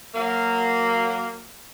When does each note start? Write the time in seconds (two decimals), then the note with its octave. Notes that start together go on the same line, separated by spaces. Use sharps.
0.15 F#3 A#3